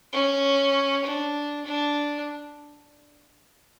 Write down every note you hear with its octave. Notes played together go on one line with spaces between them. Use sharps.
C#4
D4
D4